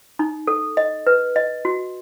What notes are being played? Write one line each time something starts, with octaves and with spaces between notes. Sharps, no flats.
D#4
A4
D#5
B4
D#5
F#4